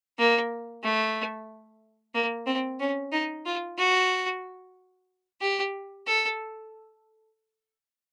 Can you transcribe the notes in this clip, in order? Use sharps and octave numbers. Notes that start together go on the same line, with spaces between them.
A#3
A3
A#3
C4
C#4
D#4
F4
F#4
G4
A4